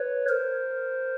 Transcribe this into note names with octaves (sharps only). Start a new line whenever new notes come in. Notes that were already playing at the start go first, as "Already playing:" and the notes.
Already playing: B4 C#5
A#4 C5